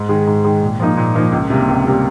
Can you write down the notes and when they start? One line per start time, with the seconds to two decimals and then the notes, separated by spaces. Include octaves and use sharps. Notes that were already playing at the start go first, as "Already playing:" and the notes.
Already playing: G#2
0.09 D#3 G#3
0.27 G#2
0.44 D#3 G#3
0.61 A#2
0.80 F3 A#3 D#4
0.97 A#2
1.15 F3 A#3 D#4
1.32 C#2
1.50 C3 G3 A#3
1.68 C#2
1.85 C3 G3 A#3